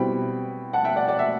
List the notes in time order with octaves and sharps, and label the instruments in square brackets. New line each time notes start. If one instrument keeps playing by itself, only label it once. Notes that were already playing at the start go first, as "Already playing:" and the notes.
Already playing: [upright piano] B2 G3 C4 E4 G5 B5
F#5 A5
E5 G5
D5 F#5
D5
E5